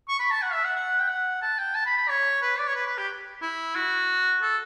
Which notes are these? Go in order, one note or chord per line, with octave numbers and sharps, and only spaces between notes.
C#6
B5
A5
F#5
E5
F#5
F#5
G5
F#5
A5
G5
A5
B5
B5
C#5
B4
D5
C#5
B4
B4
G4
E4
F#4
A4